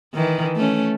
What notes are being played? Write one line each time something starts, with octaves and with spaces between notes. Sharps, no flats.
D#3 E3
A3 C#4